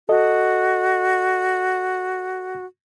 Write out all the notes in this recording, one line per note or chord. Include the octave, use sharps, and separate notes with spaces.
F#4 A4 D#5